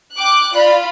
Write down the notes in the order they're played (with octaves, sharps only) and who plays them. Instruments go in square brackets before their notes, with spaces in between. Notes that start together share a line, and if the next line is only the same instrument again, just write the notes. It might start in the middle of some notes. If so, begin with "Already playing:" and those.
[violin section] G5 D6 F#6
[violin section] F4 B5 [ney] D5